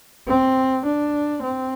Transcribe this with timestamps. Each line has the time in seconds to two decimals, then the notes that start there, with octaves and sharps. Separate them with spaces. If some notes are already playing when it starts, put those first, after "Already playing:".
0.27 C4
0.85 D4
1.43 C4